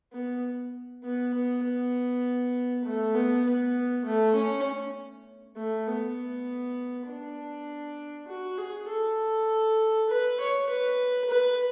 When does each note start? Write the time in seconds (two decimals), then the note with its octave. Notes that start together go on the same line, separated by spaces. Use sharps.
0.13 B3
1.04 B3
1.34 B3
1.64 B3
2.85 A3
3.15 B3
3.46 B3
4.05 A3
4.35 C#4
5.56 A3
5.87 B3
7.08 D4
8.28 F#4
8.58 G#4
8.89 A4
10.09 B4
10.40 C#5
10.69 B4
11.30 B4